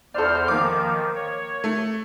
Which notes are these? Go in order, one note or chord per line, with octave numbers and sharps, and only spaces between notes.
E2 A4 C5 D5 F6
D#3 F3 A#3 D6
C#5
A3